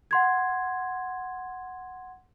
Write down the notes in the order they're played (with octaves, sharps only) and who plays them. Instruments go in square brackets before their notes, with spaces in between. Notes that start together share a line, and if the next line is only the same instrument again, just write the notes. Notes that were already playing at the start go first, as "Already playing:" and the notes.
[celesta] F#5 C6 G#6